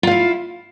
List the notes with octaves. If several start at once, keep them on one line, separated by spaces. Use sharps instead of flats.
E4 F4 F5